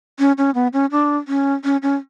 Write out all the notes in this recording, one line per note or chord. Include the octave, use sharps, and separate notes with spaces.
C#4
C#4
B3
C#4
D4
C#4
C#4
C#4